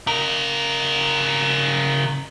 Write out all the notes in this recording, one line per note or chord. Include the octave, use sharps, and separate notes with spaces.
C#3 A#4